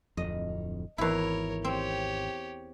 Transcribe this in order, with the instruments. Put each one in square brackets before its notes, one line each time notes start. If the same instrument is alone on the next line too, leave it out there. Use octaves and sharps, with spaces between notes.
[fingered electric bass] D1 G#1 F2 [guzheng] D#5
[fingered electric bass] G#1 [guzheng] E2 E4 [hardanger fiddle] A#4 C#5
[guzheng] C4 [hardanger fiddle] G4 C#5